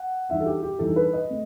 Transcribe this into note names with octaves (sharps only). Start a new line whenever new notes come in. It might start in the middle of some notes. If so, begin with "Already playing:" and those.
Already playing: F#5
G2 E3 G3 D#4 E5
A4
G4
G4
G2 E3 G3 D#4 A4
B4
D#5
A3